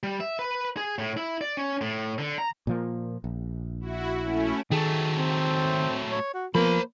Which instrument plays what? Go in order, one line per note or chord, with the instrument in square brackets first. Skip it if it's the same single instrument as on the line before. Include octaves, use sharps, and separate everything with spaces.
[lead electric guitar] G3
E5
B4
G#4
A2
E4
D5
C#4
A2
D3
A#5
[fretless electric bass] A#2 F3 A#3
A#1
[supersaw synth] E4 F#4
A3 C#4 E4
[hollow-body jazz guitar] D#3 G#4 A4 [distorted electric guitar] F#3 A3
[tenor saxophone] C4
C#5
F#4
[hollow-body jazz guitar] F3 B3 [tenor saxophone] A#3 [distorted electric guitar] C5 B5